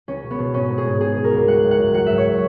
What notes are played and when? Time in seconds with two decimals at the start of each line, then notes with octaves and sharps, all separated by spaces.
0.08 C#2 C#4
0.23 B2
0.30 B3
0.39 B2
0.54 G#2 C#4
0.70 G#2
0.78 G#4
0.86 G#2
1.01 B2 G#4
1.16 B2
1.24 A#4
1.32 C#2
1.47 G#3 F#5
1.63 F#2
1.71 F#5
1.79 F#2
1.93 F#3 F#5
2.06 G#2 E5
2.18 C#5